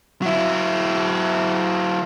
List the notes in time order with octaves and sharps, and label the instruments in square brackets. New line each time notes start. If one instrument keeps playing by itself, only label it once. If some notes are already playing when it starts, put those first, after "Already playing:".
[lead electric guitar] F#3 E4